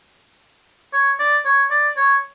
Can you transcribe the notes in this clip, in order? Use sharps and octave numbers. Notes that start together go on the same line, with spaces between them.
C#5
D5
C#5
D5
C#5